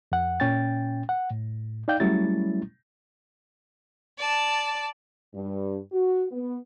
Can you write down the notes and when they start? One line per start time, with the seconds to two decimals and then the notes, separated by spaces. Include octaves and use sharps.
0.12 F2 F#5
0.40 A#2 C#4 G5 A6
1.09 F#5
1.31 A2
1.88 D#4 D5 F5 G5 G6
2.00 F#3 G3 A3 C#4 E4 A6
4.18 D5 A5
5.35 G2
5.93 F#4
6.31 B3